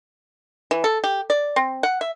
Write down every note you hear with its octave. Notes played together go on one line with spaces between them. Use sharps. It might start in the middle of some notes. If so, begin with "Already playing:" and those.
E3
A4
G4
D5
C4
F#5
E5